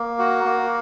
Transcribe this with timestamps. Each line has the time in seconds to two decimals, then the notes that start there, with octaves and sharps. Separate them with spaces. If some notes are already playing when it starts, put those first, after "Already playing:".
Already playing: A#3
0.19 F#4
0.45 A#3